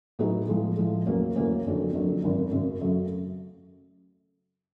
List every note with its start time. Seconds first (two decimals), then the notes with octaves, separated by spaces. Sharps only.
0.19 A2 F#3 B3 D#4 G#4
0.48 A2 F3 G#3
0.77 A2 F3 G#3
1.06 E2 C#3 F#3 A#3 C#4
1.36 E2 C#3 F#3 A#3 C#4
1.64 F#1 F2 D3 F#3
1.93 F#1 F2 D3 F#3
2.23 G#1 F#2 C#3
2.52 G#1 F#2 C#3
2.81 F#2 C#3 F#3 A3